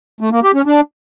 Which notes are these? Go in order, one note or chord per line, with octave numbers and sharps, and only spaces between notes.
A3
A#3
G4
C#4
D4